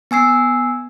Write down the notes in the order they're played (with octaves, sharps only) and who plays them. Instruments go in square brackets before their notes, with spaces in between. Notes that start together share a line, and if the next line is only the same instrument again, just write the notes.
[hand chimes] B3 G#5 E6 C7